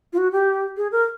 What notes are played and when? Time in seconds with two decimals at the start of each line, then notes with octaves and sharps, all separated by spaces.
0.13 F4
0.18 F#4
0.32 G4
0.77 G#4
0.92 A#4